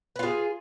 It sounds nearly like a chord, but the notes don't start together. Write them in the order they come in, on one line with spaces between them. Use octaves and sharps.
B4 F4 G#4